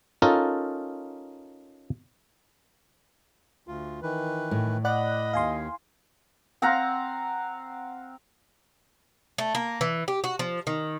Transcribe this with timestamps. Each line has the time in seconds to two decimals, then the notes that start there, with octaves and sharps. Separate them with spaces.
0.22 C#4 D#4 F4 A4 A#4
3.68 D2 F4
4.02 D#3 E3 B4
4.51 A2
4.85 D5 D#5 F#5 B5 F#6
5.33 D#2 F5 G#5 C6
6.62 C4 F5 F#5 A#5
9.38 A3
9.55 A#3
9.81 E3
10.08 G4
10.24 F#4
10.39 F3
10.67 D#3